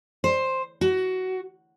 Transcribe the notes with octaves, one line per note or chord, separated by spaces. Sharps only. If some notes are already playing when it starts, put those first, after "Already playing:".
C5
F#4